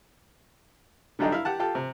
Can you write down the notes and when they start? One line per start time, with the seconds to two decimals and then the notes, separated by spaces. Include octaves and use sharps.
1.19 D3 F#3 G3 D4 D#4 G4
1.32 E4 F5
1.45 G4 F#5 A5
1.59 F4 G4 A4
1.75 C3